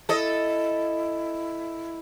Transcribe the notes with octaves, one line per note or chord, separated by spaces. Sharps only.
E4 A4 D#5